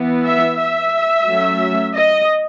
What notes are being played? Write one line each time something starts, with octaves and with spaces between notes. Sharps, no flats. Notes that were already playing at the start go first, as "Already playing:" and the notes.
Already playing: E3 B3
E5
E5
F#3 A3 C#4
D#5